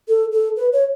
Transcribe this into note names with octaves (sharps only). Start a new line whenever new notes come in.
A4
A4
B4
C#5